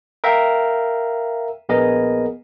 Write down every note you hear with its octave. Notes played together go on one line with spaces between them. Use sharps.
A#4 E5 F5 G5
A#1 B3 G#4 A#4 D#5